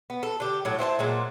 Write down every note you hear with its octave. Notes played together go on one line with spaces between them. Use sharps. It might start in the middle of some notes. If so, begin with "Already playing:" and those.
B3
A4
D3 G4
A2 F#3
E4 C5 D#5 A5
A#2 F#3 G#3